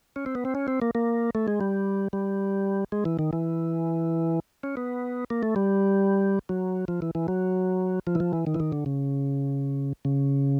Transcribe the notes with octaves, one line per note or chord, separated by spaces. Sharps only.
C#4
C4
B3
C4
C#4
C4
A#3
A#3
A3
G#3
G3
G3
G#3
E3
D#3
E3
C#4
B3
A#3
A3
G3
F#3
F3
E3
E3
F#3
F3
E3
F3
E3
D#3
E3
D#3
D3
C#3
C#3